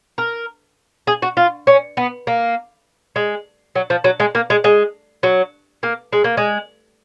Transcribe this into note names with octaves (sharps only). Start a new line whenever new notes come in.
A#4
G#4
F#4
F4
C#4
B3
A#3
G#3
F#3
F3
F#3
G#3
A#3
G#3
G#3
F#3
A#3
G#3
A#3
G#3